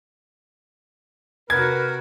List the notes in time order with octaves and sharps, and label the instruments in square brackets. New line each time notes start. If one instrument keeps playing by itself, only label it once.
[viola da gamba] C3 F#4 [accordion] A#4 [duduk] B4 [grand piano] G#6